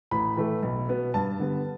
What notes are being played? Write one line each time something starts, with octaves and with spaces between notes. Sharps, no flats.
A1 B5
A2 E3 A3
B1
B2 B3
G2 A5
D3 G3 B3